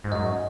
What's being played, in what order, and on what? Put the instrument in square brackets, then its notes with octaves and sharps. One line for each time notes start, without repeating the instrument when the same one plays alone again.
[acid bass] G#2
[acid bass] F#2 [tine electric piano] D#5